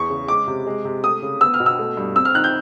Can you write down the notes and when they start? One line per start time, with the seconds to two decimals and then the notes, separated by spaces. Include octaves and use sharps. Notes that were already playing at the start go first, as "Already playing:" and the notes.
Already playing: E2 C#6
0.10 C#3
0.28 G#3 D6
0.47 C3
0.67 G#3
0.85 C3
1.03 A3 D#6
1.22 C#3
1.41 B3 E6
1.54 F6
1.60 B2
1.66 E6
1.79 A3
1.97 G2
2.16 C4 E6
2.25 F6
2.35 D#3 F#6
2.44 G6